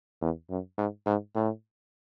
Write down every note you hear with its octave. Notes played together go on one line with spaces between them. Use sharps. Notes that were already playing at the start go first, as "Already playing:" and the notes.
E2
F#2
G#2
G#2
A2